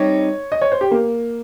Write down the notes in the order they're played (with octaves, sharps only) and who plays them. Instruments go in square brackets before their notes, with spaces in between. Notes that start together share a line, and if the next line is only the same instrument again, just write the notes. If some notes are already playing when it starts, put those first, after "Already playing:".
Already playing: [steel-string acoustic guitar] G3 C4 D#4 [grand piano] C#5
[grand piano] D#5
C#5
C5
G4
A#3